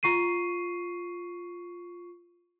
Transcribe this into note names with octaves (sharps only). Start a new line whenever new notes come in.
F4 C#6 C7 D#7